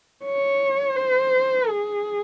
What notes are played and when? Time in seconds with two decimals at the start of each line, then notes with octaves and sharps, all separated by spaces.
0.24 C#5
0.96 C5
1.69 G#4